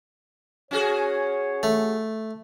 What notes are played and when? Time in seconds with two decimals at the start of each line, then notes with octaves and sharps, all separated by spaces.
0.71 C#4 F#4 G#4 C#5
1.63 A3